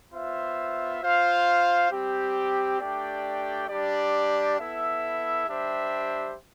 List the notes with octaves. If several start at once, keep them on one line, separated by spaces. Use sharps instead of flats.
B3 F4 C5 E5
F4 C5 F5
G3 C4 G4
A3 D4 G4 D5 G5
G3 D4 G4 D5
B3 E4 A4 E5
G3 D4 G4 C5 E5